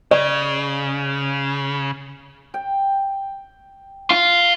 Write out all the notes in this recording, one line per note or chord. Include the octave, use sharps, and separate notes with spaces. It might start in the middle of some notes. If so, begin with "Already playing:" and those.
C#3 D5
G5
F4